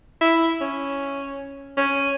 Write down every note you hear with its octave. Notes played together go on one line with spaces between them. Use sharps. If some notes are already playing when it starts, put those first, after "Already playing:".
E4
C#4
C#4